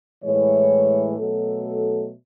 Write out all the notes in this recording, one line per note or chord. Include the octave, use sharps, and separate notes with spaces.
A2 E3 G#3 C#5
B2 F#3 A3 A4